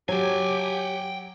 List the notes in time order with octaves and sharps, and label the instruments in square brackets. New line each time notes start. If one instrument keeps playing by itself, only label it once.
[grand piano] F#3 [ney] G4 [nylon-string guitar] C#5 [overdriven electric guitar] G5 G#5